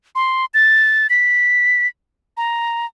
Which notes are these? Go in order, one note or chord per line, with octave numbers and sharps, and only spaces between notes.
C6
A6
B6
A#5